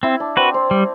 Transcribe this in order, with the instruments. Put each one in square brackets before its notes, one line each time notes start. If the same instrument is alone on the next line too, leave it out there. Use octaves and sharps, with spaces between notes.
[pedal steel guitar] C4 [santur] E4
[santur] D4
[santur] C4 [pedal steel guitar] F#4 B4
[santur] C4
[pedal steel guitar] G3